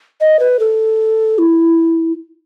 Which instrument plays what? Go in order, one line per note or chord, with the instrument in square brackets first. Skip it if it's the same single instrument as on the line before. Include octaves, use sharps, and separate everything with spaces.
[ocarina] D#5
B4
A4
E4